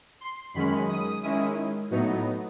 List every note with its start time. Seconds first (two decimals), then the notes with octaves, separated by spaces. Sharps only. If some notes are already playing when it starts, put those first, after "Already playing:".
0.21 C6
0.54 F#2 D#3 G#3 C#4 B5
0.89 D#6
1.23 D#3 G#3 C#4 E4
1.91 A2 F#3 B3 D#4